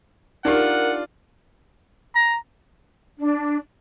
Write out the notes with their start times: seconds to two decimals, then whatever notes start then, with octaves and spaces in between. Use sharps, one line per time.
0.45 D4 D#4 F4 G4 A#4 F#5
2.15 A#5
3.19 D4